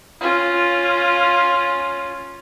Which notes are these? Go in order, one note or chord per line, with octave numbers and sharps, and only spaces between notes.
C#4 F4